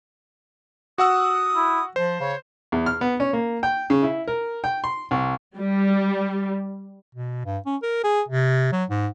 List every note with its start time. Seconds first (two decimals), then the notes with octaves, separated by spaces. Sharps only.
0.98 F#4 F#5 D#6 E6
1.55 E4
1.96 F3 C5
2.20 C#3 C#5
2.72 E2
2.86 F6
3.01 B3
3.20 C#4
3.33 A#3
3.63 G5
3.90 C#3
4.03 E4
4.28 A#4
4.64 G5
4.84 C6
5.11 C2
5.57 G3
7.15 B2
7.45 G2
7.66 C#4
7.83 A#4
8.04 G#4
8.28 C3
8.72 F#3
8.90 G#2